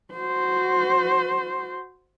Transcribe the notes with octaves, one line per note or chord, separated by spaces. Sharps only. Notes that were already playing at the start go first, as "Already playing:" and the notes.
F#4 C5